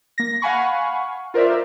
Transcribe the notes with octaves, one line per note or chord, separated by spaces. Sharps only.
A#3 A#6
F5 F#5 G#5 B5 C#6
F4 A#4 C5 D5 E5